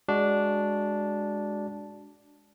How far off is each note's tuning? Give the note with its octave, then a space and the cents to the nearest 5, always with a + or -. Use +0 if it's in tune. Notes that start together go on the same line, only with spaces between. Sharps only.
G#3 +0 D4 -5 F#4 +5